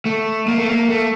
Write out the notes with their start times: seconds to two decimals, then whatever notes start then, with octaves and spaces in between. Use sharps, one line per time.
0.06 A3
0.48 A#3
0.58 A3
0.68 A#3
0.89 A3